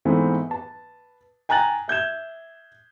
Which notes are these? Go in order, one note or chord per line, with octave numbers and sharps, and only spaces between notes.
G#2 E3 A3 B3 C4
B4 A5
G5 G#5 A#5 F#6 A6 F#7
E5 G6 G#6 E7